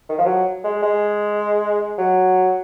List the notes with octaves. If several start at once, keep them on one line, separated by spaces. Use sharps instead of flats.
D#3
F3
F#3
G#3
G#3
F#3